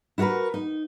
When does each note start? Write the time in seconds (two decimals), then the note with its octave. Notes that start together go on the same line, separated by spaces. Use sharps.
0.18 E4 F#4 G#4 A#4 B4
0.54 D#4